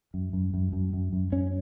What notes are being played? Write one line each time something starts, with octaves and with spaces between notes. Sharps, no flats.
F#2
F#2
F#2
F#2
F#2
F#2
F#2 C#4